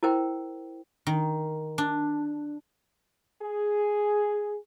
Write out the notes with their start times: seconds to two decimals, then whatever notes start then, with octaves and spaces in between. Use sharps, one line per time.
0.03 E4 A#4 C5 G5
1.07 D#3
1.78 D4
3.42 G#4